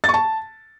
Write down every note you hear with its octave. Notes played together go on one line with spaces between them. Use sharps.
A6
C#6
A5